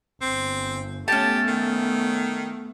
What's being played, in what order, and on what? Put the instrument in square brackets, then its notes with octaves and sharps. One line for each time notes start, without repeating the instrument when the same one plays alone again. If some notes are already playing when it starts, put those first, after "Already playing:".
[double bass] G1 [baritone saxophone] C4
[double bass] A3 B3 [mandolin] C#4 A5 [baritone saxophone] G4
[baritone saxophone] D#3